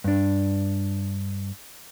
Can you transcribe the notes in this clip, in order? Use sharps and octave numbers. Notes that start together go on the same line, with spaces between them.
G2 D4